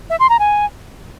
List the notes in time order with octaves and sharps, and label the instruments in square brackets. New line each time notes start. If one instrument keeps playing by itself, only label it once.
[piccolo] E5
C6
A#5
G#5